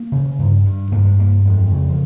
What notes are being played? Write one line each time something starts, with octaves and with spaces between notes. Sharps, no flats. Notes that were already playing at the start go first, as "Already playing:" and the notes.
Already playing: A#3
C#3
G2
G2
G2 A#3
G#3
G2 A#3
F2 G#3
C#3
F3